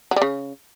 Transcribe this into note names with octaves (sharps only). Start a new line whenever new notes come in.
F#3
G3
C#3